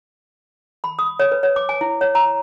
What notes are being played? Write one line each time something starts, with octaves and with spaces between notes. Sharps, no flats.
B5
D#6
C#5
B4
C#5
D6
G#5
E4
C#5
A#5